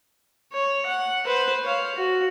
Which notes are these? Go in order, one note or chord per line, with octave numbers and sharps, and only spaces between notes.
C#5
F#5
B4 C5
C#5 F5
F#4